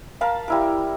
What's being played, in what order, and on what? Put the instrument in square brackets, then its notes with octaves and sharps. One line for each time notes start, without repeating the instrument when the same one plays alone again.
[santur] A#4 F5 A5 B5
G3 E4 A#4